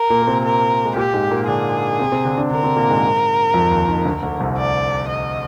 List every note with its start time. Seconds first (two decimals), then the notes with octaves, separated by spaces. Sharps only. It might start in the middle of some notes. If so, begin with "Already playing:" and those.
Already playing: A#4
0.10 A#2 A#3
0.22 A#3
0.27 C3 C4
0.44 A#4
0.85 G#3
0.96 A#2 A#3 G4
1.13 G#2 G#3
1.30 A#2 A#3
1.47 D3 D4 G#4
1.99 C3 C4
2.12 C3 C4
2.25 D3 D4
2.38 D3 D4
2.51 D3 D4 A#4
2.64 C3 C4
2.76 A#2 A#3
2.89 G#2 G#3
3.54 F2 F3
3.71 D#2 D#3
3.88 D#2 D#3
4.05 D2 D3
4.23 D2 D3
4.40 C2 C3
4.57 D5
5.08 D#5